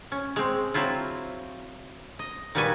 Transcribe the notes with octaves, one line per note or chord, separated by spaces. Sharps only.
C#4
G#3 C4
F#3 C4 E4 F4
D#5
A#2 D#3 G3 F#4 B4 G#5